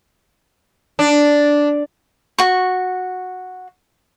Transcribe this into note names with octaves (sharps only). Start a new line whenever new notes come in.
D4
F#4 C#6